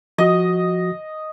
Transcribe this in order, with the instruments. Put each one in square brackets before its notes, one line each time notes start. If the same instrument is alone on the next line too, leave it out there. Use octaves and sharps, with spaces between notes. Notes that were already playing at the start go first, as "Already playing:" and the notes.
[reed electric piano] F3 F#4 D#6 [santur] D#5